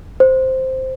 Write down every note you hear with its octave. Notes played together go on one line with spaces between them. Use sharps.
C5